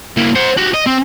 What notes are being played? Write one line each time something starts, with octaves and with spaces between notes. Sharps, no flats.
A#3 E4
C5 F#5
F#4 G4
D#5
C4